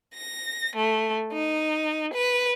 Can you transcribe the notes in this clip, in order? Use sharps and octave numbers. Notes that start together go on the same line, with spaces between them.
A#6
A3
D#4
B4